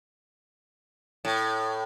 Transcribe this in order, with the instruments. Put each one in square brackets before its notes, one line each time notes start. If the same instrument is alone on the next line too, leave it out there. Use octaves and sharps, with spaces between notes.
[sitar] A2